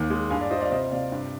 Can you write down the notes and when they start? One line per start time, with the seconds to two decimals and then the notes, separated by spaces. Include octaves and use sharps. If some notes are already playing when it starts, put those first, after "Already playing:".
Already playing: D#2
0.10 G#3
0.30 G2 F5 G#5
0.40 D5 F5
0.51 F4 C5 D#5
0.61 D5 F5
0.71 C3 C5 D#5
0.91 C3 D5 F5
1.12 G2